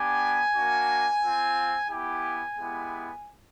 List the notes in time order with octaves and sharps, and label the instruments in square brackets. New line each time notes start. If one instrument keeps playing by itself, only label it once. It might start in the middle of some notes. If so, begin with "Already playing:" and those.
Already playing: [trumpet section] B3 D4 G4 G#5
A#3 D4 F#4
C4 F4
B3 E4 G4 G#5
G#3 B3 E4 G4